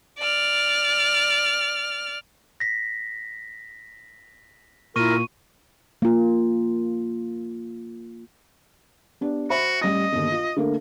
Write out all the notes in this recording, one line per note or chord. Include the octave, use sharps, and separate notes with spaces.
D5 F6
A#6 B6
A#2 E4 F4 A#4 C#6 D#7
A#3 F4
B3 D4 G4
F#4 C5 E5 B5
A1 G3 D#5 A#6
G1 D#2
F4
D3 A3 A#3